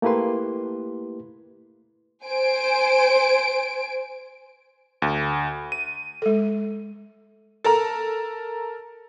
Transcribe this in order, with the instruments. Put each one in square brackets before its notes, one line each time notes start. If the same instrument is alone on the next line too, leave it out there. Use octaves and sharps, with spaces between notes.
[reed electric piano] A3 A#3 E4 G4 B4 C6
[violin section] C5 G#5 D7
[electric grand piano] D2
D#7
[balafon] G#3 A4
[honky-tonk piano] A4 A#4 A#5